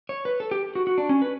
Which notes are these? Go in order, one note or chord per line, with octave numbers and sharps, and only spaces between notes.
C#5
B4
A4
G4
F#4
F#4
D4
C#4
B4